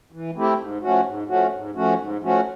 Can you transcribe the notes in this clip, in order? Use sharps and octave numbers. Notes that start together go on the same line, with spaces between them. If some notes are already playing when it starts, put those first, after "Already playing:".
E3
A3 C4 E4 G4
G#2
F3 A3 C#4 F#4
G#2
F3 A3 C#4 F#4
G#2
F3 A3 C#4 F#4
G#2
F3 A3 C#4 F#4